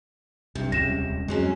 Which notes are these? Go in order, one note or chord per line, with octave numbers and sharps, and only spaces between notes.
B1 G2 C3 C4
D#1 C#2 C3 G3 C#4 A#6 E7
F2 F#3 G#3 C4 C#4